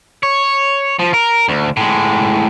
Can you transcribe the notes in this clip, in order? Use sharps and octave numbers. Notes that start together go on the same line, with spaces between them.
C#5
F3
A#4
D2
A2 G#3